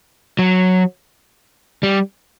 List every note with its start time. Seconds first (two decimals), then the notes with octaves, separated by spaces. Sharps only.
0.39 F#3
1.83 G3